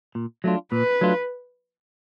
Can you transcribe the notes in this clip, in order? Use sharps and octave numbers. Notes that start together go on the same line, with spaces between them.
A#2
F#3 A3 D4 F4
A#2 B4
F#3 A3 D4 F4